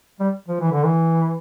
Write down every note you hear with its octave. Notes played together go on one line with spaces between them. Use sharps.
G3
F3
E3
D3
E3